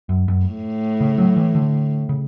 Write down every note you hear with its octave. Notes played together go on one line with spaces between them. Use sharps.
F#2
F#2
A2
C#3
F#3
E3
D3
C#3